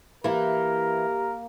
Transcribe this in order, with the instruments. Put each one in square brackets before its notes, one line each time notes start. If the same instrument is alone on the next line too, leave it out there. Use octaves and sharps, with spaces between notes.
[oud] E3 E4 [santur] A#3 A#5 [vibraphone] G4 [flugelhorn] A#4